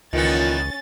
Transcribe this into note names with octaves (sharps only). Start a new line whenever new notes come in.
C#2 A#2 D#3 E3 B3 C#4 A6